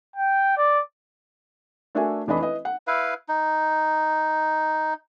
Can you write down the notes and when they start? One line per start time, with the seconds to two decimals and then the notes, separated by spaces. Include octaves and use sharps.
0.16 G5
0.57 D5
1.95 A3 D4 F#4 A#4 E5 G#5
2.27 F1 E3 D4 D#5 B5
2.38 E4 B4 D#5
2.65 F#5
2.87 E4 B4 F5
3.29 D#4